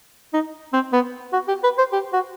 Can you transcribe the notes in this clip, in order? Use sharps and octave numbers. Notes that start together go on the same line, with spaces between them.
D#4
C4
B3
F#4
G4
B4
C5
G4
F#4